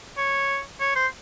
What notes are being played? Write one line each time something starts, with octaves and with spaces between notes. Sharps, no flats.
C#5
C#5
C5